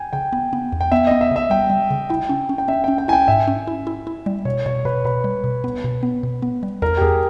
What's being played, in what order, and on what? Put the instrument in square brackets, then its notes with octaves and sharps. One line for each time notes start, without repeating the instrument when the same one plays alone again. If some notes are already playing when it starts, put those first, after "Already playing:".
Already playing: [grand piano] G5 G#5
[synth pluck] C#3 [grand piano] G5
[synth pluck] B3
B3
E2
[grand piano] G5
[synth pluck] B3 [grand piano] E5
[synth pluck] B3 [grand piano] D#5
[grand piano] E5
[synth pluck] C#3 [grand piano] E5
[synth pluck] G3 [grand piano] G5
[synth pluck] G3
C#3
[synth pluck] E4 [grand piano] G5
[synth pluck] C#4
C#4
[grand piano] G5
[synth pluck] C#4 [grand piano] E5
[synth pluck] C#4 [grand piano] G5
[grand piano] G5
[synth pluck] E4 [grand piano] G#5
[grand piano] G5
[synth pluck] G#2 [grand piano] E5
[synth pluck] C#4
E4
E4
E4
G3
[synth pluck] B2 [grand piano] C#5
[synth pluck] B2 [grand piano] C#5
[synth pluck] B2 [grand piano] B4
[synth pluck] B2 [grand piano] B4
[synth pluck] G3
B2
B3
B2
B3
B2
B3
G3
[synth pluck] E2 [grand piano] A#4
[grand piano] G4
[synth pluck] E2 [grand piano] G#4